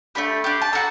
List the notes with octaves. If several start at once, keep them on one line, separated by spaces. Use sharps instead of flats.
A3 D4 G4 B5
D4 G4
A5
F#4 A4 A#5